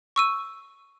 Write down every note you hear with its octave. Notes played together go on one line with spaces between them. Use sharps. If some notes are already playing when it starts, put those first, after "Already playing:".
C#6 E6 D#7